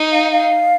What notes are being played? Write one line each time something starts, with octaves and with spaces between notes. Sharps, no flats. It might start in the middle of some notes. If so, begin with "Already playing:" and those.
Already playing: D#4
F5
F5